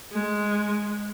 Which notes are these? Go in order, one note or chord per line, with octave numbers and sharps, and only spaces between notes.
G#3